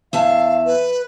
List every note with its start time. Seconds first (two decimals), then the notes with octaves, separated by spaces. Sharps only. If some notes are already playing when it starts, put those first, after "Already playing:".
0.13 E2 E5 F5 A5
0.66 B4